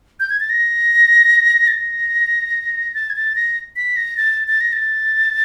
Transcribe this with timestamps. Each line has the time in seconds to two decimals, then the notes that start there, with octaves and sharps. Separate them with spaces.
0.20 G6
0.30 G#6
0.40 A6
0.50 A#6
1.68 A6
1.73 A#6
2.94 A6
3.10 G#6
3.16 A6
3.36 A#6
3.76 B6
3.96 A#6
4.17 A6
4.48 A6
4.61 A#6
4.73 A6